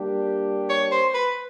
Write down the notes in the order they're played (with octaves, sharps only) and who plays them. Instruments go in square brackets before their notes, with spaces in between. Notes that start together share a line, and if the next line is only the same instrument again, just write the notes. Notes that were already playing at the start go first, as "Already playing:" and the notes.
Already playing: [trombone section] G3 A#3 D4 G4
[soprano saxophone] C#5
C5
B4